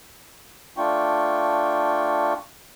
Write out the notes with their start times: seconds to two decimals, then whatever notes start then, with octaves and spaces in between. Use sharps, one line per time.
0.77 A3 D4 F4 G5 C#6